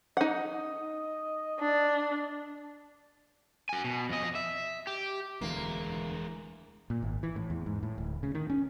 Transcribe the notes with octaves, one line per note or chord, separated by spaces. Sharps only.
D#4 D#5 F#5
D4
F#4 G#5
B2
F2 D#5
E5
G4
E1 D2 E3 G#3 A#3 E4
A#2
G#1
E3
A2
E2
G#2
A2
D1
C#3
D#3
C#4